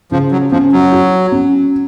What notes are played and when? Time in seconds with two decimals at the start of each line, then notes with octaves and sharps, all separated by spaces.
0.12 C#3 F3
0.32 F#3
0.52 F3 C#4
0.72 F#3
0.92 F#4
1.32 C#4